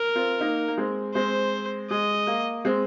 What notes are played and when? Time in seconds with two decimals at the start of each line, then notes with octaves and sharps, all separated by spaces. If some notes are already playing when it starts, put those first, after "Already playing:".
Already playing: A#4
0.15 C4 F4
0.41 A#3 D#4
0.68 A#3
0.77 G#3 C4
1.14 G#3 C4 C5
1.90 G#3 D#5
2.27 A#3
2.65 G#3 C4